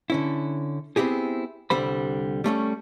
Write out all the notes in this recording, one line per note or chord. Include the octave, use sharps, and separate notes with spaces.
D3 C#4 E4
B3 C4 E4 G4 G#4
C2 D3 G3 C5 B5
G3 A3 C4 C#4